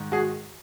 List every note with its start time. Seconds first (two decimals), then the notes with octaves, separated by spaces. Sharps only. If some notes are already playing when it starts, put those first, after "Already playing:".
Already playing: G#2 D#3
0.12 F#4 G#4